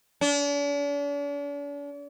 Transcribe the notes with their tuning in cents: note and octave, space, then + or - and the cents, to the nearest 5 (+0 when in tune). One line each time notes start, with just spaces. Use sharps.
D4 -45